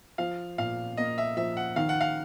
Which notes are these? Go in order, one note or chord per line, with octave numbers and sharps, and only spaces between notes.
F3 F5
A#2 F5
A#3 D#5
E5
F3 E5
F#5
D#3 F5
F#5
F5